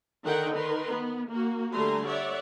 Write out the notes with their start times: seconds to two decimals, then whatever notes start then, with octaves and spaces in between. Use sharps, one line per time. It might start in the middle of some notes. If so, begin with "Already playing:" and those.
0.23 D3 D#3 D#4 A#4 F#5 G5
0.53 D#3 A#4 B4 C6
0.90 B3
1.29 A#3 F#4
1.74 D3 G3 A3 G#5 A#5 C6
2.07 C#5 D5 E5 F#5